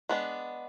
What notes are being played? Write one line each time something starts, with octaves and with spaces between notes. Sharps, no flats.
G#3 B3 D4